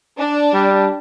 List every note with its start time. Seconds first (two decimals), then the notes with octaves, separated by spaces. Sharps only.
0.18 D4
0.54 G3